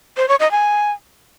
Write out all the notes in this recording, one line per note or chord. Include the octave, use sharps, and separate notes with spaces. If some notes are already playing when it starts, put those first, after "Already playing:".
C5
C#5
D#5
G#5